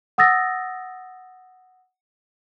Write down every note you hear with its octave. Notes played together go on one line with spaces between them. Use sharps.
F#5 D#6 E6 A6 A#6